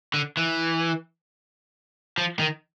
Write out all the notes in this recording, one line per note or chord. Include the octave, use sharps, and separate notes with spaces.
D3
E3
F3
D#3